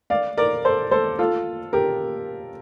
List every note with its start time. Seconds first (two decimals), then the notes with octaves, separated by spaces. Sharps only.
0.10 D5 F5
0.37 A#4 D5
0.65 A4 C5
0.91 A4 C5
1.19 F4 A4
1.73 G4 A#4